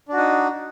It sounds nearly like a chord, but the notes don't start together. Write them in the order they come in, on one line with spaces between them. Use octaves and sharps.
D4 F#4 D#4